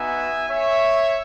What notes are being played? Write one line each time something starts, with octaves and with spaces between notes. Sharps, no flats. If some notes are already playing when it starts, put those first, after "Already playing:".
Already playing: B3 D#4 F#4 E5 G#5
C#5 E5